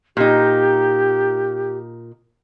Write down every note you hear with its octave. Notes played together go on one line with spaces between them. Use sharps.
A#2 D#4 G4